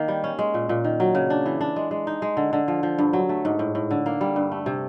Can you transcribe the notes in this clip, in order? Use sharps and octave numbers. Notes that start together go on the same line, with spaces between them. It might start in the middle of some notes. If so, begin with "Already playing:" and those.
Already playing: D#3 A#3
G3
C#4
G#3
A#2
A#2
D#3
F#3
C#3
D4
E3
D4
G#3
G#3
D#4
G#3
D3
D3
F3
F3
G2
F#3
A3
G#2
A2
A2
D3
A#3
G3
G2
A3
C3